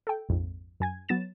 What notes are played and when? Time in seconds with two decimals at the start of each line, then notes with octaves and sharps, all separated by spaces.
0.07 A4 G5
0.29 A#1 F2 G#2
0.80 F#2 G#5 G#6
1.09 F#3 B3 A6 E7